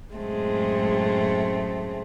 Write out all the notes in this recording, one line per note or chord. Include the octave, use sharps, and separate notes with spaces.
F#2 A2 G#3 A3 C4